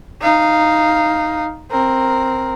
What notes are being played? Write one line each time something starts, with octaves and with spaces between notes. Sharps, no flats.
D#4 F5
C4 A#4